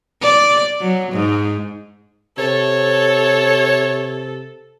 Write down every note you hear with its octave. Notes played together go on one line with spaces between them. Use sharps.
D5
F#3
G#2
C3 A4 C#5